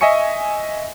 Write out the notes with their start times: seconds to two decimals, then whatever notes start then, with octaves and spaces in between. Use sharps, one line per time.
0.01 D#5 E5 G#5 C#6 C#7